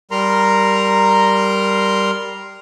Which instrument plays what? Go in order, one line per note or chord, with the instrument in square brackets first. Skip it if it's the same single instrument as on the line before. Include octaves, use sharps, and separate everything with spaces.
[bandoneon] G3 A#4 A#5 C6